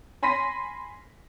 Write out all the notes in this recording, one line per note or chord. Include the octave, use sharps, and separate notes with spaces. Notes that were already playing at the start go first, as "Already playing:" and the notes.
G#5 B5 C6 A#6 B6 D#7